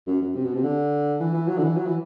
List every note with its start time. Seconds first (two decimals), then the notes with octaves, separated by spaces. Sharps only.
0.07 F#2
0.22 F#2
0.35 C3
0.44 B2
0.54 C3
0.63 D3
1.20 E3
1.34 E3
1.48 F#3
1.58 D3
1.63 E3
1.77 F#3
1.86 E3